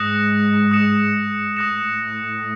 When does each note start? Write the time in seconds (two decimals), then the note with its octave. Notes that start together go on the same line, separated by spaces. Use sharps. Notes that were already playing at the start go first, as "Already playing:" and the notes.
Already playing: G#2 G#3 D#6 F#6 A#6 C#7 E7
0.71 D#6 F#6 A#6 C#7 E7
1.56 A2 A3 D#6 F#6 A#6 C#7 E7